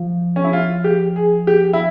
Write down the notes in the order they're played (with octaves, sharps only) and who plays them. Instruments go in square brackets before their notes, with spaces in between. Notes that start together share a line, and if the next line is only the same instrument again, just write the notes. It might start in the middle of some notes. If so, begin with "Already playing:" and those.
Already playing: [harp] F3
[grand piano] C#4
E4
F4
G4
G#4
G4
E4